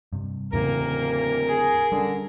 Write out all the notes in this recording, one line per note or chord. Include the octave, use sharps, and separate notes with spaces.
G2 C3
D1 E2 A2 C#3 A#3 A#4
G#4
D3 G3 C#4